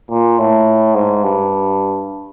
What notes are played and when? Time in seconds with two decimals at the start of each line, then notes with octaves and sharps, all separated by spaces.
0.11 A#2
0.39 A2
0.95 G#2
1.23 G2